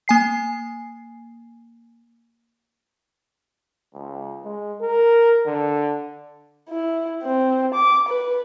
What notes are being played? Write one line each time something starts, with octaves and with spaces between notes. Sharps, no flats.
A#3 G#5 C7
C#2
G#3
A#4
D3
E4
C4
D6
B4